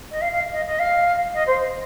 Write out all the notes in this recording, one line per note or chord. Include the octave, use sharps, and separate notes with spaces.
D#5
F5
F5
D#5
D#5
F5
D#5
C5